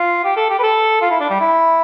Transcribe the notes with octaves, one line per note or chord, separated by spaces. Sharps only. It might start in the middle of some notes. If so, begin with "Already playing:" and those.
Already playing: F4
G4
A4
G4
B4
A4
F4
E4
D4
G3
E4